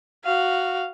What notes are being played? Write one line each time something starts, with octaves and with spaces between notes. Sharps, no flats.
F#4 F5